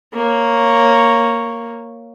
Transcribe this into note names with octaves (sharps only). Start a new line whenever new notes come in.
A#3 C#5